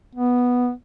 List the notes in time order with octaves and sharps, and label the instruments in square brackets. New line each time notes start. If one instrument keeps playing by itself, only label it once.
[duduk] B3